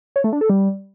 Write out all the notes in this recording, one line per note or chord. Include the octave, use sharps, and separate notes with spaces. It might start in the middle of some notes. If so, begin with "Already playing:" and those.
C#5
A3
D4
A4
G3